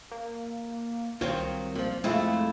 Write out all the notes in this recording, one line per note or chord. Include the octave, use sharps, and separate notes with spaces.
A#3
C2 D#3 F#3 C4 F4 C5 C#5
A#2 F3
F2 G#3 A3 C4 E4 F4